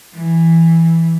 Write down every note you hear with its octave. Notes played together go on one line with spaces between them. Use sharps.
E3